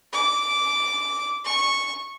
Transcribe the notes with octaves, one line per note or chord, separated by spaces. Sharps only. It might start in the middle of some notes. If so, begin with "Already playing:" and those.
D6
C#6